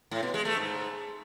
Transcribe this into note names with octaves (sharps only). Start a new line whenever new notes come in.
A2
B2
G#3
A3
G#2